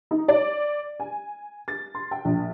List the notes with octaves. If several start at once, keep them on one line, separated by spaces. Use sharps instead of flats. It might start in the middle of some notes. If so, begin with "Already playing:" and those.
D#4
D5
G#5
A6
C6
G5
A#1